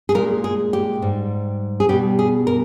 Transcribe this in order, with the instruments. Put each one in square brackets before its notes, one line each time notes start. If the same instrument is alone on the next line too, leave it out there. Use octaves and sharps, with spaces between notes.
[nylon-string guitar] G#4
A#2 G#3 A#4
G#4
G4
G#2 G3
G#4
B2 G3 G4
G#4
A#4